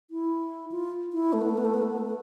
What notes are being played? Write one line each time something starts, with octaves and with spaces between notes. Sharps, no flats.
E4
F4
E4
A3
B3
A3
B3
A3
B3
A3
B3
A3
B3